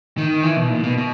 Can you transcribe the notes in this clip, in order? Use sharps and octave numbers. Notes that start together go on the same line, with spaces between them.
D#3
E3
B2
A#2
B2
B2